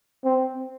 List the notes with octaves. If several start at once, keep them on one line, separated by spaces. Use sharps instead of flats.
C4